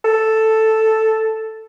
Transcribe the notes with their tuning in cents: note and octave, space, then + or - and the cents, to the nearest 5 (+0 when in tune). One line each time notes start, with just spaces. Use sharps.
A4 +0